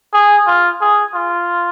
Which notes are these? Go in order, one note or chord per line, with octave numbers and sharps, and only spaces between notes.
G#4
F4
G#4
F4